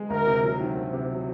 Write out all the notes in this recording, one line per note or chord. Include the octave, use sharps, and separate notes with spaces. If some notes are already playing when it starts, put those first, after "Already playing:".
Already playing: G#3
D2 A#4
C3
F#3
D#3
D2
C3
F#3